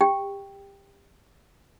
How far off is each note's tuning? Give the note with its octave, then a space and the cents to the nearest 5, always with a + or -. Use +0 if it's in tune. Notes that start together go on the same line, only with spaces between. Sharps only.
G4 +25 G5 +5